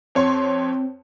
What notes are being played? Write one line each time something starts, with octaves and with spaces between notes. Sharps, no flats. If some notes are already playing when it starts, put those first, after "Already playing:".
F2 C4 C#5 C6